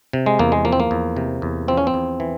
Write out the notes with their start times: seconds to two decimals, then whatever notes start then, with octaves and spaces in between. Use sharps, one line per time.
0.13 C3
0.26 G#3
0.39 E2 A#3
0.52 G#3
0.65 F3 A#3
0.73 C4
0.80 A#3
0.91 E2
1.16 C3
1.42 E2
1.68 F3 C4
1.77 C#4
1.87 C4
1.94 E2
2.20 E3